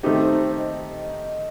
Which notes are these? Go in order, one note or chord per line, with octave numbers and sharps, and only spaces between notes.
D#3 A3 C4 D#4 G4 C5
D#5